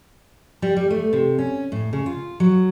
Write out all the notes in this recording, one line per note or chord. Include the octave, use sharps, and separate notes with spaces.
G3
G3
A3
C3
C#4
A2
C#3
F4
F#3